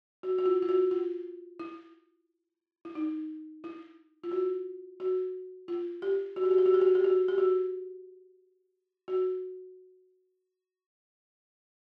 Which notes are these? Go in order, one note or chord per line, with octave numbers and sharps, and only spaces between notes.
F#4
F#4
F4
F4
F#4
F4
E4
E4
D#4
E4
F4
F#4
F#4
F4
G4
F#4
G4
F#4
G4
F#4
G4
F#4
G4
F#4
G4
F#4
F#4